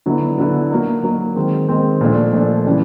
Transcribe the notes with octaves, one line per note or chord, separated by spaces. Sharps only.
D3 F#3 B3 E4
D3 F#3 B3 E4
F#3 A#3 D#4
F#3 A#3 D#4
D#3 G#3 C4
D#3 G#3 C4
A#2 F3 A3 D4
A#2 F3 A3 D4
C#3 E3 G3